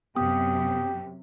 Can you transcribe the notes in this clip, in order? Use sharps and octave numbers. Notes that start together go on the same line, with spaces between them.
F#2 C3 B3 G4 D#6